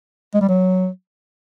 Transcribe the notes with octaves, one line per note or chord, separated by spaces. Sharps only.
G#3
G3
F#3